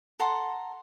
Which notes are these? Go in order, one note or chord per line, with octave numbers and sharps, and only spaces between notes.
A4 F#5 A#5 C6